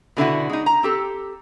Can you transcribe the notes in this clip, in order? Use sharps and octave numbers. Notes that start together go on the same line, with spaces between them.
B2 D3 E4 F#4
G#3 D#4
A#5
C4 G4 A4